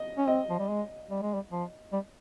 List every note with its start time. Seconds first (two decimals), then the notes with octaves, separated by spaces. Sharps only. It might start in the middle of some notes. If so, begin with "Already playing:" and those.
Already playing: D#5
0.17 C#4
0.28 C4 D#5
0.49 F3
0.59 G3
0.69 G#3
1.10 G3
1.22 G#3
1.34 G3
1.51 F3
1.92 G3